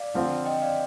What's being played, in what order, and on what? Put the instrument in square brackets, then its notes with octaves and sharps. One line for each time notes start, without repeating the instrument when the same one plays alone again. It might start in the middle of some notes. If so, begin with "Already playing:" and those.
Already playing: [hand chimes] D5 F5
[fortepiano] D3 F3 C4 F4
[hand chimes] D#5 G5
D5 F5